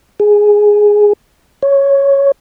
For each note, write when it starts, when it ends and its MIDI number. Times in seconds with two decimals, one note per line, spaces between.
0.20 1.13 68
1.63 2.32 73